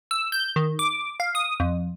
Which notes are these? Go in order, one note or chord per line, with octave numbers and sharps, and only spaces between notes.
E6
G6
D#3
D6
F5
D#6
F2